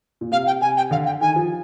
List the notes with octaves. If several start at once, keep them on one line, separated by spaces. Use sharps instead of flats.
A#2
C3 F5
G5
C3 G#5
G5
D3 F5
G5
D#3 G#5
F3